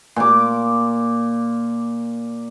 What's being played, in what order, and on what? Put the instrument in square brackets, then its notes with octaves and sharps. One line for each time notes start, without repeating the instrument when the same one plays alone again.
[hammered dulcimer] A#2 D6